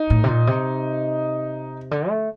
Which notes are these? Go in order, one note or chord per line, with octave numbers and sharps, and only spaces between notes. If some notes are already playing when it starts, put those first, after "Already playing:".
Already playing: D#4
A2
C3
A#2
C3
D3
A3